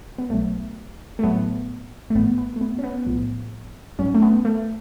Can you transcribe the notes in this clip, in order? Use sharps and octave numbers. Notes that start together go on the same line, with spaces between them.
B3
B1 B2 F#3 A3
A3
A1 A2 F#3 B3
A3
G#1 G#2 F3 B3
B3
A3
B3
C#4
B3
B1 A2 F3
G#1 G#2 F#3 C#4
A3
B3
A3